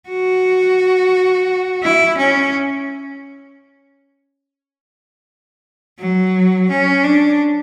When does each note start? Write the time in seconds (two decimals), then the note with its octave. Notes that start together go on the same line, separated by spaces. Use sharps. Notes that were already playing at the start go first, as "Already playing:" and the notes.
0.09 F#4
1.83 E4
2.18 C#4
6.00 F#3
6.70 C#4
7.04 D4